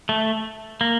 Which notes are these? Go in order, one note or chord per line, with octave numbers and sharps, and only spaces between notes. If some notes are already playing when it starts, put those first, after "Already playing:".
A3
A#3